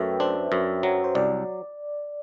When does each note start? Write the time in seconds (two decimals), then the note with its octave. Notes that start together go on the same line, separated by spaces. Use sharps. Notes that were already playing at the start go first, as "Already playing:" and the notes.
Already playing: F#2 A3 B4 E5 G5
0.20 D4 C5
0.52 F#2
0.83 F#3
1.04 C5
1.15 C2 D5